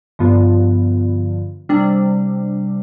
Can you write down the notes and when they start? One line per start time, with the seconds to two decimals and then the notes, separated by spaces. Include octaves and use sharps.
0.19 G2 D3 F3 B3 F4
1.69 C3 G3 D4